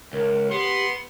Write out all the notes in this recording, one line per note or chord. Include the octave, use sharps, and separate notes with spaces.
C#2 A#4
B3 G4 C6